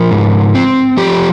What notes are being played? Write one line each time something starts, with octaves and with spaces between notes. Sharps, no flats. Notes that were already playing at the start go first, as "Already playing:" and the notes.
Already playing: F3 A#4
G#2
C4
F3 G4